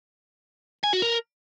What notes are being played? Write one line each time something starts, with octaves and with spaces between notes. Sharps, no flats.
G#5
F#4
A#4